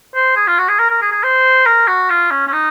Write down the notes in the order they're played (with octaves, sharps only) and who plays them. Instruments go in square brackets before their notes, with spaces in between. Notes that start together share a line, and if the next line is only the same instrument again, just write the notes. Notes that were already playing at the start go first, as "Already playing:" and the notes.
[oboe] C5
G#4
F4
F#4
G#4
A#4
A#4
G#4
G#4
C5
A#4
F#4
F4
C#4
C#4
D#4